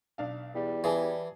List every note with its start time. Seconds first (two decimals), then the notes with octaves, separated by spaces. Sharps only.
0.18 B1 D4 F5
0.55 E2 G3
0.84 E3 G#4 G#5 A5